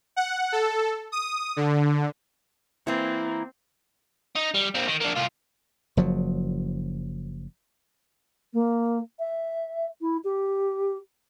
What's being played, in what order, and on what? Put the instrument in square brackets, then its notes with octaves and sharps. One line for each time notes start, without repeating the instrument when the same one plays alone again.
[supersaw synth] F#5
A4
D#6
D3
[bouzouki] E3 A#3 [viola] C4 [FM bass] E4
[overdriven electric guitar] D#4
G3
A#3 C4
D#3
A#3 D4
C2 F4
[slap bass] F#1 F3 F#3
[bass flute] A#3
E5
E4
G4